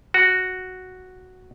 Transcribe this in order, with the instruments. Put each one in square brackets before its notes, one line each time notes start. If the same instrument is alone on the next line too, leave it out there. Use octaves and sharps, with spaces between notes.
[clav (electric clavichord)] F#4